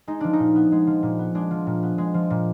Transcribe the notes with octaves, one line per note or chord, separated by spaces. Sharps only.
G#3 D#4
F3 D4
D#4
A#2
B3
G#3
F3
A#2
B3
G#3 D4
F3
A#2
B3
G#3
F3
A#2